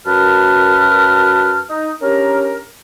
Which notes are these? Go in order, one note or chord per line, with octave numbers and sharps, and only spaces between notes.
F#2 F#4 A#4 B4 A5 F6
D#4
C#4 D4 G4 A#4